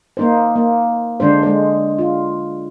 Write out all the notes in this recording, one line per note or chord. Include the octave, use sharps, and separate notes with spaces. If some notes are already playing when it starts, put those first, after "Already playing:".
A#3 D#4 C5
A#3
D3 G#3 D4 C5
G#3 C5
F4